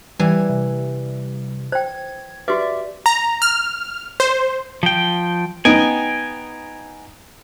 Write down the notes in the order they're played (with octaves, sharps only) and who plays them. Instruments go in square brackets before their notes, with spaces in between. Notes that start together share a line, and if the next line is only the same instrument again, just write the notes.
[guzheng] E3 [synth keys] G3 [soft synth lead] G#6
[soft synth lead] C3
[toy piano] C5 G5 [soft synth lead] G#6
[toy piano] F#4 G4 B4 [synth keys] D5 [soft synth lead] E5
[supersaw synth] A#5
F6
C5
[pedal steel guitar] F3 G5
[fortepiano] B3 D#4 [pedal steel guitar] G5 G#5